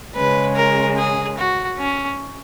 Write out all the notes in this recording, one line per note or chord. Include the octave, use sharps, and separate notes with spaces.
C#3 G#3 C#4 B4
A#4
G#4
F#4
C#4